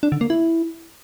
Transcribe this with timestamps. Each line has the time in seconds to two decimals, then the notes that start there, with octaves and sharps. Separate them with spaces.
0.03 D4
0.12 D3
0.21 A#3
0.30 E4